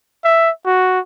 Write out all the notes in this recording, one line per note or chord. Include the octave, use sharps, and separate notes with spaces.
E5
F#4